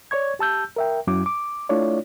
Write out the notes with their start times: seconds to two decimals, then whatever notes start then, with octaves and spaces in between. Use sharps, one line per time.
0.11 C#5 D5 C#6 G#6
0.39 G4 A5 E6 G6
0.76 A#4 E5 G5
1.07 F#2 F#3 C#4 E4 D6
1.26 D6
1.69 A3 D4 E4 F4 C#5 D5